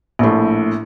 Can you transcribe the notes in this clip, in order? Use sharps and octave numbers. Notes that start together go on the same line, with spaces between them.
A#1 A2